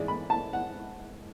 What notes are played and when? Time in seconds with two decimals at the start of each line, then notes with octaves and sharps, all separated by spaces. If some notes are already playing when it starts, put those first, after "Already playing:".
Already playing: G#2 E3 G#3 D5
0.08 B5
0.30 A5
0.53 F#5